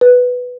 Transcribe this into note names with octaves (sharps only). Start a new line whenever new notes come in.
B4